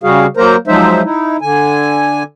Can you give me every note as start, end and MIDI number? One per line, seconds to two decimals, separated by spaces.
0.03 0.26 49
0.03 0.26 55
0.03 0.26 66
0.03 0.26 68
0.03 0.26 77
0.37 0.56 54
0.37 0.56 58
0.37 0.56 70
0.37 0.56 72
0.37 0.56 82
0.67 1.02 53
0.67 1.02 54
0.67 1.02 56
0.67 1.02 63
0.67 1.02 72
0.67 1.02 76
1.04 1.37 63
1.04 1.37 64
1.41 2.23 50
1.41 2.23 80